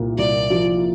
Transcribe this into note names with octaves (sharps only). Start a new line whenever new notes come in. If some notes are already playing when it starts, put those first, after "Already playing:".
Already playing: C2 A#2
C2 D5
F3